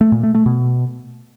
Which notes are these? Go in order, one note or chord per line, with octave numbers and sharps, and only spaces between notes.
A3
A#2
A3
A3
B2